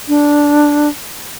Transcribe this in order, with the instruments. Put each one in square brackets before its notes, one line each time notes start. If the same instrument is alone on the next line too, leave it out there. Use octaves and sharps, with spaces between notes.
[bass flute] D4